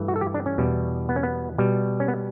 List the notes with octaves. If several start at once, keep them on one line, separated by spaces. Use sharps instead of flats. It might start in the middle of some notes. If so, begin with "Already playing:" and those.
Already playing: G2 E3 A3
F#4
A4
G4
D4
C#4
E2 B2 G3
B3
C#4
B3
B2 G3
C#4
B3